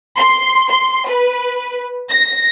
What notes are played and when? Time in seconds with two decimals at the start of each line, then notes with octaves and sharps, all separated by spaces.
0.17 C6
0.71 C6
1.08 B4
2.10 A#6